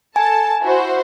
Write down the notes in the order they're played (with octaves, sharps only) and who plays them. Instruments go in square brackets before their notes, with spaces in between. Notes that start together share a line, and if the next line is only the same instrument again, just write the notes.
[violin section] A4 A5 [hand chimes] G#5
[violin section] E4 F#4 C5